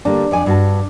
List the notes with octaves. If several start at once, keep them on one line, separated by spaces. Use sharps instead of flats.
D3 G3 A#3 D4
F2 D5 G#5
G2 F#4 A5